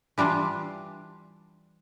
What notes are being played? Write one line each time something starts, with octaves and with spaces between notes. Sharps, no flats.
E3 G3 D4 F4